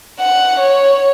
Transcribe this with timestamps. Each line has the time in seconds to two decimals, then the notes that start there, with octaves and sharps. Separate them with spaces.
0.20 F#5
0.60 C#5